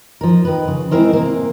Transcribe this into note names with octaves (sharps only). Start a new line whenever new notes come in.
F3 A#4
D#3 B4
C#3
G#3 A3 C4 E4 A#4 C5
C3 E3 A#3